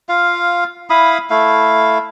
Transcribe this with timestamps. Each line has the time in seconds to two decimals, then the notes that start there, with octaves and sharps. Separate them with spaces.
0.09 F4 F5
0.90 E4 F5 B5 D#6
1.30 A3 E4 F5